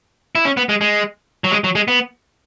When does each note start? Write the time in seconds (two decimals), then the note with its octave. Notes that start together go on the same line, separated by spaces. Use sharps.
0.35 E4
0.45 C#4
0.57 B3
0.69 G#3
0.81 G#3
1.44 F#3
1.52 G#3
1.64 F#3
1.75 G#3
1.88 B3